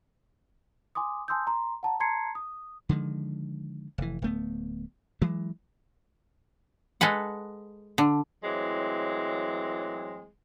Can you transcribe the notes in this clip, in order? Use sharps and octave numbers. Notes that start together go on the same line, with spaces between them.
G#5 C6 D6 D#6
G#5 A5 C6 D#6 E6 G6
A#5 C6
F#5 A5 A#5
A5 A#5 C6 G#6 C7 C#7
D#6
D3 D#3 F3 G#3
F1 E3
D1 A3 B3
E3 F#3 G#3
G#3 A4 B4 F#5
D3
A2 E3 F#3 G#3 C4